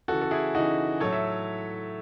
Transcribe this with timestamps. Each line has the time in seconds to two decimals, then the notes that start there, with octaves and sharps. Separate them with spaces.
0.08 C#3 E3 F#4 A4
0.21 A4
0.31 E4 G#4
0.55 C#3 E3 D#4 F#4
1.00 A2 F#3 A4 C#5
1.13 E5